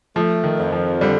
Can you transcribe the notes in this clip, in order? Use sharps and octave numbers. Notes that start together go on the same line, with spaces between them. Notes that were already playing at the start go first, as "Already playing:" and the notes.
F3 A3
D#3
F2
F3
D3 G3